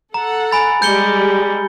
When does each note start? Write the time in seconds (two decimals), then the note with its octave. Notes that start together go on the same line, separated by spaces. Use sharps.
0.14 A4 F#5 A#5
0.51 G#5 B5 A6
0.82 G3 G#3 G6 C#7 G7